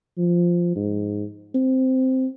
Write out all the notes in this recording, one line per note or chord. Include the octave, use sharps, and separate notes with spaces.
F3
G#2
C4